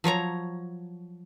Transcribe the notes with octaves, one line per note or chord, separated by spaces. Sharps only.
F3 F#3 C#5 A#5